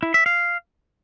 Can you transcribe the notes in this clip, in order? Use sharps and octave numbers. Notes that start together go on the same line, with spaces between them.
E4
E5
F5